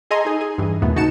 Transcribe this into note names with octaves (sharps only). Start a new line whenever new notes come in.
G#4 A4 D#5 G#5 A#5 C6
D#4 G#4
G#4
G2 E3
D#2 A#2 A3 B3
C#3 D#4 F#4 A5 C#7 E7